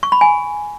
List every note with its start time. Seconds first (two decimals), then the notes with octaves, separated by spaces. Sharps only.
0.03 C#6
0.12 B5
0.21 G#5